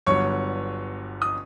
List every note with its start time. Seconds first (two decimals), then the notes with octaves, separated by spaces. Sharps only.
0.06 G1 G2 D3 F#3 B3 C#5 C#6
1.22 D#6